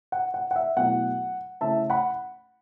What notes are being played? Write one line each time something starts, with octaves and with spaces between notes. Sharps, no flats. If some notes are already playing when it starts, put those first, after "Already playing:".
F#5
F#5
F#5
E5
B2 F#3 A3 E4 F#5
C#3 A3 E4 E5 A5
F#5 B5